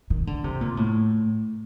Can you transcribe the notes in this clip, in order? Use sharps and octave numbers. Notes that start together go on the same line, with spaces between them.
D#3
D3
C3
A#2
A2